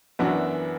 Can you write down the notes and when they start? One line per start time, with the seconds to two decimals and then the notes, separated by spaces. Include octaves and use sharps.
0.19 F#2 E3 B3 D4 F#4